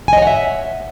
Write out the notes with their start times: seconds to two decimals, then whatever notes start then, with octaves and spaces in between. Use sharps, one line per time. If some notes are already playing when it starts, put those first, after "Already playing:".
0.08 G#5
0.13 D#5
0.18 C#5
0.22 F#5
0.27 E5